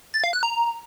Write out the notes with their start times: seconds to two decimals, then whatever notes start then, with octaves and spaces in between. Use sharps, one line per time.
0.14 A6
0.24 F5
0.33 F#6
0.43 A#5